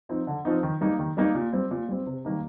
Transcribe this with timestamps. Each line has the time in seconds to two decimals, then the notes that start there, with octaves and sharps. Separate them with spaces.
0.09 F3 C4 D#4
0.27 D3
0.45 F3 C4 D#4
0.63 D#3
0.81 G3 A#3 D#4
0.99 D#3
1.17 G3 A#3 D#4
1.35 A#2
1.53 G3 C4
1.71 A#2
1.89 G3 C4
2.06 C3
2.25 D#3 G3 A#3 D#4